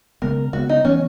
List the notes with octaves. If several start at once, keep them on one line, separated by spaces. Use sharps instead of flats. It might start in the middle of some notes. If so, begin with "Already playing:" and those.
C#3 G#3 B3 A#4
C#3 G#3 B3 F#4
D#4
E3 B3 C#4